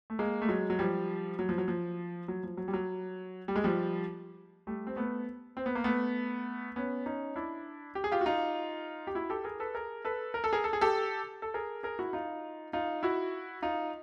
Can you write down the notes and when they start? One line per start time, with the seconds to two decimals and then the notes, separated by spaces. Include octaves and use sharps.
0.10 A3
0.19 G#3 A#3
0.42 A3
0.48 F#3 G#3
0.70 F#3
0.79 F3 G3
1.39 F#3
1.49 F3
1.58 F#3
1.68 F3
2.28 F#3
2.43 F3
2.57 F#3
2.68 G3
2.73 F#3
3.48 G3
3.56 G#3
3.64 F3 G3
4.67 G3 A3
4.87 C4
4.96 A3 B3
5.57 C4
5.66 B3
5.75 A#3
5.84 A3 B3
6.76 B3 C#4
7.06 C#4 D#4
7.36 D4 E4
7.95 G4
8.04 G#4
8.12 F4 G4
8.21 F#4
8.26 D#4 F4
9.07 G4
9.15 E4 F#4
9.30 G4 A4
9.44 G#4 A#4
9.60 A4 B4
9.74 G#4 A#4
10.05 A4 B4
10.34 A#4
10.44 A4
10.53 G#4 A#4
10.64 A4
10.73 G#4
10.81 G4 A4
11.42 A4
11.54 G#4 A#4
11.83 G#4 A#4
11.99 E4 F#4
12.13 D#4 F4
12.73 D#4 F4
13.03 E4 F#4
13.62 D#4 F4